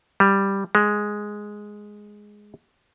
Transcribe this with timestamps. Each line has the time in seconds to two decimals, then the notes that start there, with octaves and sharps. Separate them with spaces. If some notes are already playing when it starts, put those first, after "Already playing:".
0.20 G3
0.75 G#3